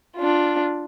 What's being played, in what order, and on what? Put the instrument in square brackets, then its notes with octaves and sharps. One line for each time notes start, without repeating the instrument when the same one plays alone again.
[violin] D4 F4